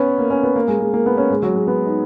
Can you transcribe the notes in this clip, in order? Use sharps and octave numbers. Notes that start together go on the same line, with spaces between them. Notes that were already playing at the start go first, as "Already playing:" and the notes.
Already playing: B3 C#4
A#3
C#4
B3
A#3
G#3
G#3
A#3
B3
C#4
G#3
F#3
G#3
B3
D#4